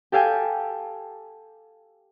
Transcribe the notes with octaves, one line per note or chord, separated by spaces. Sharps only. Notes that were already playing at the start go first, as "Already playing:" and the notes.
G4 A4 F5 G5 G#5